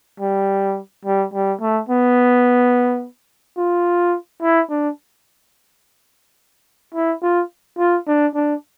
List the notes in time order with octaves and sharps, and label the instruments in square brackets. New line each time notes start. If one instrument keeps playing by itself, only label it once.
[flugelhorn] G3
G3
G3
A3
B3
F4
E4
D4
E4
F4
F4
D4
D4